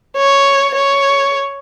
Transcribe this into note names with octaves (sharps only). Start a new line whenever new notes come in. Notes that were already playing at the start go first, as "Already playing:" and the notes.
C#5
C#5